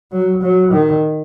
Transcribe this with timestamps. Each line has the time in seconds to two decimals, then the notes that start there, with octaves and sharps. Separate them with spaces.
0.13 F#3
0.43 F#3
0.72 D#3